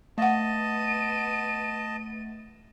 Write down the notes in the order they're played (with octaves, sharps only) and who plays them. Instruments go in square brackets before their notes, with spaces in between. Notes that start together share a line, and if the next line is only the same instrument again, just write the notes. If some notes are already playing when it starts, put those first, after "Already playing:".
[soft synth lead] A3 [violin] B3 D#7 [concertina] D#5 A5 [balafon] F5 F#5